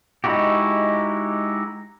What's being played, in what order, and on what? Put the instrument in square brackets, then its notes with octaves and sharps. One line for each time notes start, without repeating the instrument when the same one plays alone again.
[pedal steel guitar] G#3 D#4 E4 F#4 G4